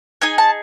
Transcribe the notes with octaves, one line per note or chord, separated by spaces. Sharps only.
D#4 G#4 G#5
A5